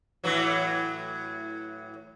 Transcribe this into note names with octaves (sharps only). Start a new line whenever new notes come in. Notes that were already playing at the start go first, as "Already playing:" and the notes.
A2 E3 F#3